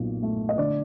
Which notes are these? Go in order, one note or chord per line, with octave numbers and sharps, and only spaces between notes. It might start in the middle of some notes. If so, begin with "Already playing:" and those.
Already playing: B1 A#2
A3
D#5
D3 D5